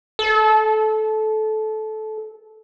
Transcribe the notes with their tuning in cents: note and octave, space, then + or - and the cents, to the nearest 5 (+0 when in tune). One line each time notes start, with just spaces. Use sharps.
A4 -20